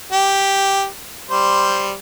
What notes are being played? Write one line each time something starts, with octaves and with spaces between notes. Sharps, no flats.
G4
G3 C5